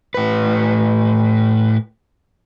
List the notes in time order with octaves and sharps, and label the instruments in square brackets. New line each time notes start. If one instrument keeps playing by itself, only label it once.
[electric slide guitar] A2 B4